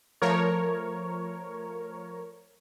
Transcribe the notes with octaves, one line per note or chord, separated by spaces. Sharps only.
F3 A3 A#4 C#5